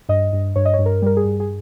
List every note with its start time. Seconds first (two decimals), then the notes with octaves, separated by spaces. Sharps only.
0.09 G2 D#5
0.33 G2
0.56 G2 C#5
0.65 D#5
0.74 C#5
0.79 G2
0.86 A#4
1.02 G3 A#4
1.17 G#4
1.25 G2
1.40 G#4